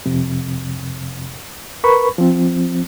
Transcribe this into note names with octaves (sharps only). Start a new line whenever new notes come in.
F2 C3
A#4 B4 B5 C#6
F3 C4